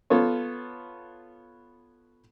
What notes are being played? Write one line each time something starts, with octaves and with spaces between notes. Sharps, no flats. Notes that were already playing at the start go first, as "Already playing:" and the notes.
B3 F4 A4 C#5